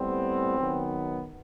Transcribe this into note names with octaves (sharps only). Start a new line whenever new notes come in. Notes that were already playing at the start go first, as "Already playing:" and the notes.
Already playing: A2 G3 B3 C4
D#3 F#3 B3